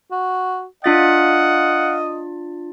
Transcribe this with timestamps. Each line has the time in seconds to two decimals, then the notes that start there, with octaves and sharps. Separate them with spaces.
0.11 F#4
0.84 D4 F4 D#5 F5 F#5 A6